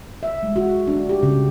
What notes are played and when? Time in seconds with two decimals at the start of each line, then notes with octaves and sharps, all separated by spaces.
0.23 E5
0.43 G#3
0.56 F#4
0.88 D4
1.09 G4
1.23 C#3